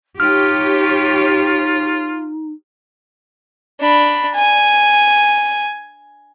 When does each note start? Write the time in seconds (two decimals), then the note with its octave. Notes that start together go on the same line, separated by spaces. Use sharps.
0.20 D#4 F4 G4 C#5 F6
3.80 D4 B5
4.34 G#5